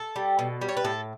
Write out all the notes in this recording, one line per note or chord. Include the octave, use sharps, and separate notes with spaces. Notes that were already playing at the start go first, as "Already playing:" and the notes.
Already playing: A4
G3
B2
G3
C#5
B4
A2 A4